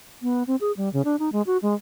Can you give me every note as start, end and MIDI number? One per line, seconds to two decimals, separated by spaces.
0.22 0.43 59
0.47 0.56 60
0.61 0.72 68
0.77 0.92 55
0.93 1.02 49
1.05 1.16 62
1.19 1.32 63
1.32 1.42 56
1.47 1.57 66
1.62 1.74 56